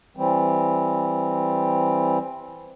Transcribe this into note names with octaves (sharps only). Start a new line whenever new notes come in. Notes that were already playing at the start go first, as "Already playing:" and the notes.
E3 G3 C4